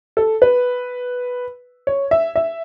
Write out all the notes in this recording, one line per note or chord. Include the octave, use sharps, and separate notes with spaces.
A4
B4
C#5
E5
E5